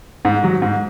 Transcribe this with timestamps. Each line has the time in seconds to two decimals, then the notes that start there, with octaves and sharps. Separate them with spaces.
0.25 G#2
0.44 F#3
0.62 G#2